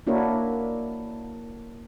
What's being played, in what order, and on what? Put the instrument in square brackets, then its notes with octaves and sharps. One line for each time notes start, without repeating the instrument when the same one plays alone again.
[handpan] A#3 D4 E4 F#4 A#4 C#5